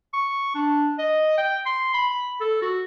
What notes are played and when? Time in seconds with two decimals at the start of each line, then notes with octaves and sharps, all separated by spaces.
0.14 C#6
0.55 D4
0.98 D#5
1.38 G5
1.66 C6
1.94 B5
2.41 A4
2.62 F#4